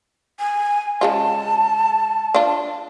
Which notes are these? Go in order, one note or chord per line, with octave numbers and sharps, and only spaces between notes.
G#5
C#3 G#3 F4 A5
D4 F4